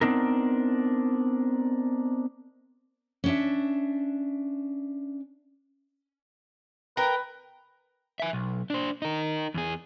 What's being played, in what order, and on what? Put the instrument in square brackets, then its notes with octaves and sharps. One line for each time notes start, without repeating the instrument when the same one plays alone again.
[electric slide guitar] B3 C4 D4 D#4 A#4
[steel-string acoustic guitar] C#4 D4 E5
[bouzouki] A#4 G5 [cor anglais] B4
[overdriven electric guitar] E5 G#5
B1
D4 C5
D#4 A#4
E2 G#4